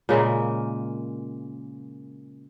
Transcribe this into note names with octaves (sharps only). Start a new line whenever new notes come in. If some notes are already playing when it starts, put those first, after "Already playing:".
A#2 C#3 G#3 A#3